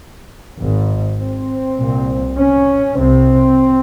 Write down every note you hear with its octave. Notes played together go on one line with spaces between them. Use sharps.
G#1 G#2
C4
C2 A#2
C#4
C2 C3 C4